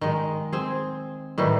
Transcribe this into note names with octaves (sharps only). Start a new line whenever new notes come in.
D#3 G#3
C4 G#4
A2 D#3 E3 G3